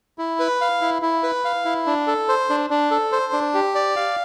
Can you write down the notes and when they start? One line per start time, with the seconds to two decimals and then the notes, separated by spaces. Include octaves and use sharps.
0.18 E4
0.39 B4
0.61 F5
0.81 E4
1.02 E4
1.23 B4
1.45 F5
1.65 E4
1.86 D4
2.07 A4
2.29 C5
2.50 D4
2.70 D4
2.91 A4
3.12 C5
3.33 D4
3.54 G4
3.75 D5
3.96 F5